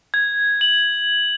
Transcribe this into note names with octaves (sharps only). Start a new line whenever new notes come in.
G#6
F#7